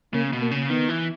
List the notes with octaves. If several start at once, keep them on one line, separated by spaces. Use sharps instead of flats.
C#3 A#3
B2
A#3
C#3
D#3 B3
E3